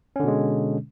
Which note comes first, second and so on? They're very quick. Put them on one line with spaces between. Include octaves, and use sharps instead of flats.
C#4 D3 B2 G#3